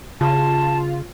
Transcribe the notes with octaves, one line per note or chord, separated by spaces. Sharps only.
C#3 F4 A5